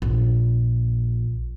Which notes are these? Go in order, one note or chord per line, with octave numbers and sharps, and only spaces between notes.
A#1